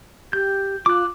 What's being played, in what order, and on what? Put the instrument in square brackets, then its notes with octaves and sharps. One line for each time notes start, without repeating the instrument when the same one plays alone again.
[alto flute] G4 [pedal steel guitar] G6
[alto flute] F4 [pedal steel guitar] D6 F#6